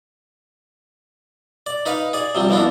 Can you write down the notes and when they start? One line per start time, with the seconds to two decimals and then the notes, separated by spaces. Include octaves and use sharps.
1.66 D5
1.86 D#4 B4 F5
2.13 G#4 D5
2.35 C3 F3 G3
2.49 F2 E3 F3 B3 D4